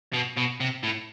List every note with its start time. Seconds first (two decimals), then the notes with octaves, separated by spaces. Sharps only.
0.14 B2
0.37 B2
0.60 C3
0.83 A2